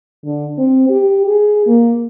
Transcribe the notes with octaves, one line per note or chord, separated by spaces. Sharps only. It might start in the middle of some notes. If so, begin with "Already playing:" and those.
D3
C4
G4
G#4
A#3